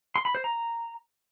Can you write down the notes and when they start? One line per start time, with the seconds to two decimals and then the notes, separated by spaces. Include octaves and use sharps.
0.16 C6
0.25 B5
0.35 C5
0.44 A#5